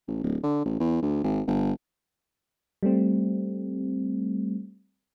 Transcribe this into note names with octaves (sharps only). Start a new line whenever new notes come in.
A1
D1
D3
A1
E2
D2
G#1
G1
G3 A3 C4